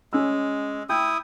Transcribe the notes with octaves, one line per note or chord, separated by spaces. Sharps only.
G#3 C#4 E6
E4 G5 D#6 G6